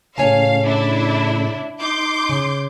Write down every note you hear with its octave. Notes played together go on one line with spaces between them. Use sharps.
A2 C#3 C#5 F5 G#5 A5
D4 E4
D#4 C6 D6 G6
C#3